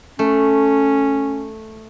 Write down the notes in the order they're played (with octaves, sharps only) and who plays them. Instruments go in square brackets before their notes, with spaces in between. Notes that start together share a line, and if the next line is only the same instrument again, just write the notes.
[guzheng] A3 [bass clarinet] C#4